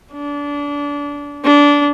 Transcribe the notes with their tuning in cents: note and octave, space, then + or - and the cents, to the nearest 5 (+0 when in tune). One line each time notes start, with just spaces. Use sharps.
D4 -25
D4 -20